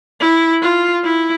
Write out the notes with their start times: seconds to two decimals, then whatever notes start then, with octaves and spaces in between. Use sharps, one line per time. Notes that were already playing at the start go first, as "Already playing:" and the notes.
0.21 E4
0.62 F4
1.04 E4